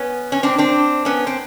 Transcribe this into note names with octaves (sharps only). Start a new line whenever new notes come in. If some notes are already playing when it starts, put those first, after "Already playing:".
Already playing: B3 C#4
C#4
C4 D4
C4 D4
B3 C#4
C4